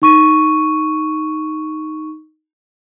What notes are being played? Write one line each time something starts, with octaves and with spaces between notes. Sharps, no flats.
D#4 C#6 D#7